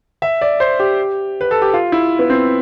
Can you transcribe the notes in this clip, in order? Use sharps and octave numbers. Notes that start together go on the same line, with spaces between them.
E5
D5
C5
G4
B4
A4
G4
F4
E4
B3
C4